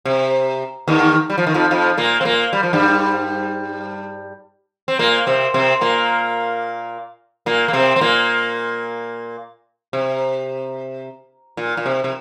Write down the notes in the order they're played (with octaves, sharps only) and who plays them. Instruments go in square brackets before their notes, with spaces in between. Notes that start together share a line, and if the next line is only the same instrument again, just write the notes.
[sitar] C3
D#2 D#3
G3
F3
D#3
F2 F3
F2 F3
A#2 A#3
C4
A#2 A#3
G3
F3
G2 G3
C4
A#2 A#3
C3 C4
C3 C4
A#2 A#3
A#2 A#3
A#3
C3 C4
C4
A#2 A#3
C3
A#2
A#2
C3
C3